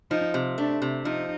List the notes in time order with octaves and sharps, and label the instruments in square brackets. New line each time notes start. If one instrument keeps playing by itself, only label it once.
[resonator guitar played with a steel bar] F3 [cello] D#4
[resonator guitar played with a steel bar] C3
[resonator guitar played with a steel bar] A3 [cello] D4
[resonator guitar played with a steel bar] C3
[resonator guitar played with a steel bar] F3 [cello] D#4